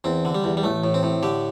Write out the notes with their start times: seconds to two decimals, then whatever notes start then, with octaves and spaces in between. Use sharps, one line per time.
0.04 E2 C4
0.25 D3
0.35 G3
0.44 E2
0.57 G3
0.63 A1 A3
0.84 A2
0.94 C4
1.03 A2
1.23 D3 G4